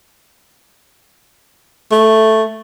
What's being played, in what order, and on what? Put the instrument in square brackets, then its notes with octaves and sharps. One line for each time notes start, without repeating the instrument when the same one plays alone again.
[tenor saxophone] A3